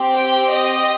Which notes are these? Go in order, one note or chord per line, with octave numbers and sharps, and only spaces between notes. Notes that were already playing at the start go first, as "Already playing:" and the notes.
Already playing: C4 G4
G5
D#5